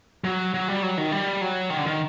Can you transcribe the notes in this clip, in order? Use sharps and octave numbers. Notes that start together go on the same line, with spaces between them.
F#3
F#3
G3
F#3
D#3
G3
F#3
D#3
D3
D#3